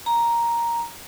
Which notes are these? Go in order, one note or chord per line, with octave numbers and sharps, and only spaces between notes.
A#5